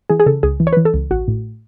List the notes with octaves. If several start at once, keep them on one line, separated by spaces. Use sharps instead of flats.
E3 G#4
G#4
C#3 A4
C#2 G#4
E3
C#5
B4
E3
A4
C#2
A1 F#4
A2